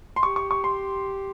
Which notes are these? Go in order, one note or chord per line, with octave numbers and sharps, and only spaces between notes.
C6
G4 C#6
C#6
C#6
C6